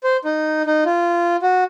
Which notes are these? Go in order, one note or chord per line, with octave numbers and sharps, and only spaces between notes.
C5
D#4
D#4
F4
F#4